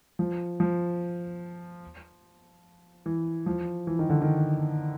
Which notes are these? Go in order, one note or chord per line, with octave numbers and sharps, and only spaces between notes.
F3
F3
E3
F3
E3
D#3
D3
D#3